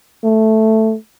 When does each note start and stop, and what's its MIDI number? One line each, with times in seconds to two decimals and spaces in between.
0.24 0.95 57